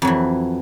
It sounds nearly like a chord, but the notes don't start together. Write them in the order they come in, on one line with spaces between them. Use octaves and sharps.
F2 F#3 E3